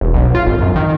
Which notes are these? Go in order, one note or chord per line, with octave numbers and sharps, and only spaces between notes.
E1
B1
F4
G#1
F#2
D#3